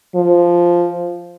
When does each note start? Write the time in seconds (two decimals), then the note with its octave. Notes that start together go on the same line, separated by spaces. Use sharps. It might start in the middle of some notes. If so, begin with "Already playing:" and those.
0.15 F3